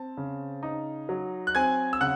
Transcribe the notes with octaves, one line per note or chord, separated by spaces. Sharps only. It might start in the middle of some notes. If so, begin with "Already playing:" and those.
Already playing: C4 A5
C#3
D#4
F#3
F#6
C4 G#5 G#6
E6
C#3 F#5 F#6